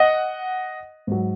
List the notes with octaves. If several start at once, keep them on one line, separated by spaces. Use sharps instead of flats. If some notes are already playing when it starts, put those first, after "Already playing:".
Already playing: D#5 F#5
G#2 F#3